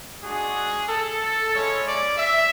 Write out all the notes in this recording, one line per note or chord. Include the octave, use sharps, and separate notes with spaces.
G#3 D4 F#4 G#4
A4
G#3 C#4 E4 C#5
D5
E5